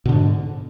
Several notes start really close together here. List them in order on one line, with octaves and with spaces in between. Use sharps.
B2 D3 G#2